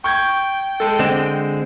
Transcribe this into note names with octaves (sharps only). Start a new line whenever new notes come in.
G5 C#6 G6 G#6
G#3 A4
D3 G#3 C4 E7